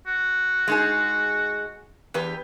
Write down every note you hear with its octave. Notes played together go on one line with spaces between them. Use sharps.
F#4
G#3 D#4 G#4
E2 G4 B4